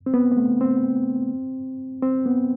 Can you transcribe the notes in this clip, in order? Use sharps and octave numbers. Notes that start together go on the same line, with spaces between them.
C4
B3
B3
A3
C4
C4
B3